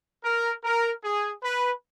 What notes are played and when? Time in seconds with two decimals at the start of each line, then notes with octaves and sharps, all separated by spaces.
0.23 A#4
0.63 A#4
1.03 G#4
1.43 B4